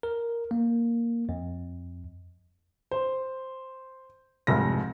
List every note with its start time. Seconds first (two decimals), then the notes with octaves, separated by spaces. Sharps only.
0.03 A#4
0.51 A#3
1.29 F2
2.91 C5
4.47 F1 C2 G#2 A#6